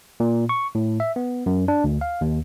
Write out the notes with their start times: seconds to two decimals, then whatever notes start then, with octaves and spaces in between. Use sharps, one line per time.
0.20 A#2
0.49 C#6
0.75 A2
1.00 E5
1.16 B3
1.46 F#2
1.68 D4
1.84 D2
2.01 F5
2.21 D#2